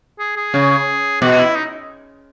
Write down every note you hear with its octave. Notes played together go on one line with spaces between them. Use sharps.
G#4
G#4
C#3
B2 F#4
E4
D#4